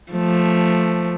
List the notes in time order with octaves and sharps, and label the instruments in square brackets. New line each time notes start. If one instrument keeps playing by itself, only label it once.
[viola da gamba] F3 A3